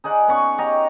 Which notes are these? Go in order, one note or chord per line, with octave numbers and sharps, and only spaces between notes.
D#4 G#4 D5 F#5
B3 C#4 C#6
G4 D#5 A#5